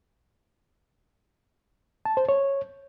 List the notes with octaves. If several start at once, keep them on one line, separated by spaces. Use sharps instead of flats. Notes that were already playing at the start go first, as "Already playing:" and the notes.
A5
C5
C#5